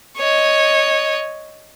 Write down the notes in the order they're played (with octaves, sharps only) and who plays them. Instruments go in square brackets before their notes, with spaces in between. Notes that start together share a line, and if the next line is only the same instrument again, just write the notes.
[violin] C#5 D#5